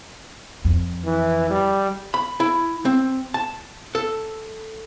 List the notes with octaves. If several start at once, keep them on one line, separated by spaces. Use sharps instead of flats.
F2
E3
G3
B5
E4
C4
A5
A4